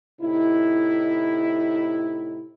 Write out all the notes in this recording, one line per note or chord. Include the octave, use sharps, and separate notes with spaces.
A2 C3 D#4 E4